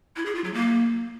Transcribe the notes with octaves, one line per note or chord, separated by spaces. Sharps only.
E4
G#4
F4
F#3
A#3